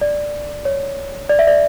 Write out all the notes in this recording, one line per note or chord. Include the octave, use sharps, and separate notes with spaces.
D5
C#5
D5
E5
D5